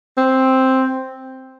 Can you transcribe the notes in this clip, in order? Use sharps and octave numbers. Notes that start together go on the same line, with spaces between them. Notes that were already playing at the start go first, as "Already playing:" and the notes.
C4